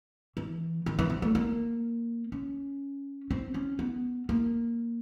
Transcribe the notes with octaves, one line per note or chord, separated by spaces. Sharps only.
E3
D#3
E3
F3
A3
A#3
C#4
C4
C#4
B3
A#3